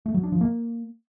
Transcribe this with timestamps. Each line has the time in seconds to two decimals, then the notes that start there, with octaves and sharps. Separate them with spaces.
0.06 A3
0.14 F#3
0.23 D4
0.32 F3
0.41 A#3